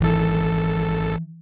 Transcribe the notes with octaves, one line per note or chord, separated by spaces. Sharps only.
G#1 E3 A4